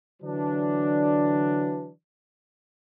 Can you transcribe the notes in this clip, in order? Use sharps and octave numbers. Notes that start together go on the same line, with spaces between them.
D3 E3 F#3 D4